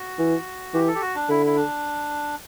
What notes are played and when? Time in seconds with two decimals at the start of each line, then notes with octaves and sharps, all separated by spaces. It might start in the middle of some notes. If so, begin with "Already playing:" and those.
Already playing: F#4
0.19 E3
0.74 E3 G4
0.88 A4
0.95 G4
1.01 F#4
1.15 D4
1.29 D3 E4
1.46 E4
1.56 D4